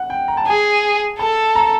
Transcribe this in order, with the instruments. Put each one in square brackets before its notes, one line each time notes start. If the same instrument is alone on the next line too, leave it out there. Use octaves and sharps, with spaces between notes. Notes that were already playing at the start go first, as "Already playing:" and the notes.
Already playing: [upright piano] F#5
G5
A#5
A5
[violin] G#4 [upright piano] G#5
[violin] A4 [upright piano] A5
[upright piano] A#5